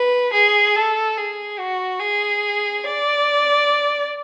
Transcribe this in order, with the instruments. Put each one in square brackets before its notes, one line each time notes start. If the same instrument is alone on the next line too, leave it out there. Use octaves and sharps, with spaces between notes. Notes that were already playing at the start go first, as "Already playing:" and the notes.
Already playing: [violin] B4
G#4
A4
G#4
F#4
G#4
D5